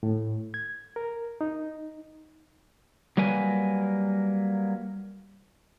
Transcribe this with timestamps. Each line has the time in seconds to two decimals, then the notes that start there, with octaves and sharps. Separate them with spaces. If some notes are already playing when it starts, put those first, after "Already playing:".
0.03 A2
0.54 G#6
0.96 A#4
1.41 D#4
3.17 F#3 G3 A#3 B4 G#5